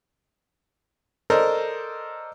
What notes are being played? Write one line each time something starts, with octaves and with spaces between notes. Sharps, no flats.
A4 A#4 C5 D5 D#5